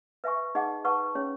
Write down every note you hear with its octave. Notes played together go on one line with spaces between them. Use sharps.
B4 E5 G#5 C#6
D#4 G#4 D#5 F#5
B4 F#5 A5 C#6
C#4 G#4 C#5